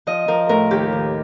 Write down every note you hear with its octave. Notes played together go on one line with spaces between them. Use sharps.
F3 D#5
F3 A#4
A2 A#4
D#2 G4
D#3